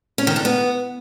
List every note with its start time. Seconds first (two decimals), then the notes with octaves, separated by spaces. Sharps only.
0.18 C#4
0.27 D#3
0.36 D4
0.45 B3